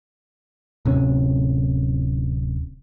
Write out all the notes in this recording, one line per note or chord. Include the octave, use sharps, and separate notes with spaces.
D1 C3 C#4